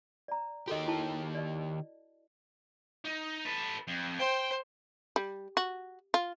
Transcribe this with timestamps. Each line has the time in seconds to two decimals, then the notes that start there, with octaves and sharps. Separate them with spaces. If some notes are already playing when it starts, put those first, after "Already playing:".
0.28 D5 A#5
0.68 D#3 F#4 G4 A4 D#5
0.87 E4 A5
1.35 D5 D#5
3.05 D#4
3.45 A4 B4
3.87 F2
4.19 C5 G5
5.16 G3
5.57 F#4
6.14 F4